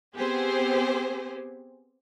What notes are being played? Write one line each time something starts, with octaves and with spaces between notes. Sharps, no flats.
B3 C4 G4 G#4 C5